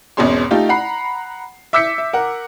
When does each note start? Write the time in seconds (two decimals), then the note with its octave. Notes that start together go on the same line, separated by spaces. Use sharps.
0.17 G#1 E2 B2 C#4 G#4 C6
0.51 A3 D#4 F4 G4
0.69 F#5 A#5 B5 C7
1.73 E5 D6 E6 G6 B6 C#7
1.98 E5
2.13 A#4 F#5